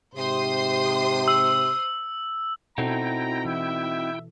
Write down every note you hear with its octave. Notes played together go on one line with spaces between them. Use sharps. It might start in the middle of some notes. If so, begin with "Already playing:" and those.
G#2 C3 C5 C6 D#6
E6
B2 C4 D#4 E4 F#4 A4 G5 A#5
E3 E5